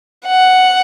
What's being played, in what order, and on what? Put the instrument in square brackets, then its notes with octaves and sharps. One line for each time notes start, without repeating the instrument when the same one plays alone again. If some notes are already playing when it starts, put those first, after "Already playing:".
[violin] F#5